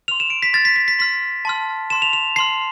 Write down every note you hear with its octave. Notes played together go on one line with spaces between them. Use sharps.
C6 F6 F7
E7
D7
B6
C6 F6 A6
B6
B6
B6
C6 F6 B6
A5 C6 F6
A5 C6 F6 E7
F7
F7
A5 C6 F6 C7